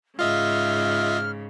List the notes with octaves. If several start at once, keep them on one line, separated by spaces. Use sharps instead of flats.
G#2 C#3 F4 D#5 E5 F6